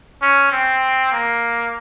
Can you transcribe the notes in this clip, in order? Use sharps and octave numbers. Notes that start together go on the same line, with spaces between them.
C#4
C4
A#3